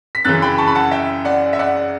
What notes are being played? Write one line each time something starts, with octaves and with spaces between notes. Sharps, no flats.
B6
F#2 C#3 E3 F#6 A6
G5 B5
A5 C#6
B5
F#5 A5
E5 G5
D5 F#5
E5
D5 F#5